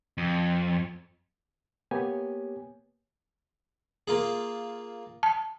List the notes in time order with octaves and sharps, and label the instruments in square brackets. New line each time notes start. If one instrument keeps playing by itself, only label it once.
[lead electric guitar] F2
[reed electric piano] A#3 B3 G4 C#5 G#5
[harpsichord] A#3 F4 G#4
[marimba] A5